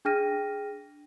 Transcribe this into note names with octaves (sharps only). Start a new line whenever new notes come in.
D4 G#4 G5 F6 A#6 D#7